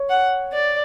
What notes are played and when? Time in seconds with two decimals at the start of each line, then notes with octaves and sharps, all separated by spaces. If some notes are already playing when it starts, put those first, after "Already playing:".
Already playing: C#5
0.10 F#5
0.53 D5